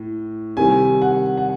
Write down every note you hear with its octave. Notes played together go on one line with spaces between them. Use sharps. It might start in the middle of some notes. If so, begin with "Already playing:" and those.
Already playing: A2
C3 D#3 G3 G#5
F#5
F#5